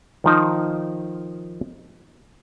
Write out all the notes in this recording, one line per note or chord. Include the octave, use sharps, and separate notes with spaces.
D#3 F3 D#4